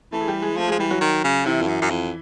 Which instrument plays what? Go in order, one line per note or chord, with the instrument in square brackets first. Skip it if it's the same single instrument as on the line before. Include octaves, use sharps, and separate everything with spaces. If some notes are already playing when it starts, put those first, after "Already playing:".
[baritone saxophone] E3 [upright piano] A3 A4
[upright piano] G#4
G3 G4
G#3 G#4
[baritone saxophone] F3 [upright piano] A3 A4
[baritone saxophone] F3 [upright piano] G#3 G#4
[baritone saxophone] E3 [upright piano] G3 G4
[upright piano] F#3 F#4
[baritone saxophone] D#3
C#3
[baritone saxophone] C3 [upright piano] E3 E4
[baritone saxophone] F2
F#2
F#2
F2